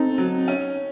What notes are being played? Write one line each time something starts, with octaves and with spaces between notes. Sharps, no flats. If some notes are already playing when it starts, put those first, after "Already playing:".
Already playing: C4 D#4 A4
F#3
C#4